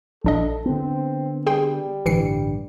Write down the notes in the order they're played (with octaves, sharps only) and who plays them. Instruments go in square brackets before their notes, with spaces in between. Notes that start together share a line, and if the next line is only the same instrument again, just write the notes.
[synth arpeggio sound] A#1 D4 D#5 [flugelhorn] A4
[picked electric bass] D3 B3 [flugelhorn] C4
[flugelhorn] G3 [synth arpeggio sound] G#4 G5 C6
[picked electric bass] A1 G2 D3 [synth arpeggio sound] E3 C7 C#7